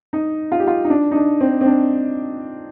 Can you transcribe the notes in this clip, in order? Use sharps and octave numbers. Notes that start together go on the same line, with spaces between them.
D#4
F4
G4
F4
D#4
D4
D#4
D4
C4
C4
D4